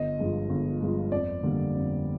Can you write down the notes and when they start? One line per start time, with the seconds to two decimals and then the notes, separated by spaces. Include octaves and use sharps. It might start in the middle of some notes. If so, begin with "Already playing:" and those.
Already playing: G1 D#5
0.19 G2 F3 G#3
0.50 G1
0.81 G2 F3 G#3
1.11 F2 D5
1.43 D3 G3 A#3
1.74 F2